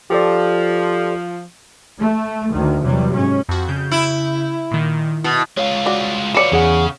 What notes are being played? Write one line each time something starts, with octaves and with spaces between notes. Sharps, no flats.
F3 G4 A4 D5
A3
D2 D3 D#3
E2 C3 F#3 G3
G#2 C#4
F2 F#4
C#3 G6
E4
A#2 D#3
B2 E4
G#3 F4 C#5
F#4 D5
F#3 F4 B4 C#5 D5 C#7 E7
E2 C#3 G#4 F#5